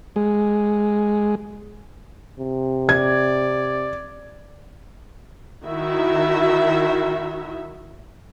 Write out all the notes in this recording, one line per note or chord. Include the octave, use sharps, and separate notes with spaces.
G#3
C3
D5 G#6
D#3 E4 F#4 E5